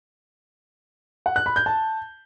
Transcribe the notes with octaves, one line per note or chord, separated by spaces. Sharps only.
F#5
F#6
B5
G6
A5